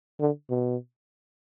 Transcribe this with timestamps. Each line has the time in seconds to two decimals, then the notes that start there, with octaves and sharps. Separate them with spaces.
0.20 D3
0.50 B2